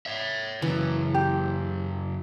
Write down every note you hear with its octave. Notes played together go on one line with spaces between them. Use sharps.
C#5 E5
F#2 C#3 E3
G4